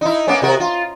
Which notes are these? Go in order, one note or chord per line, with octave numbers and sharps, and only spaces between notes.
D#4 E4
A#3 B3 C#4
C3 F#4 A#4
F4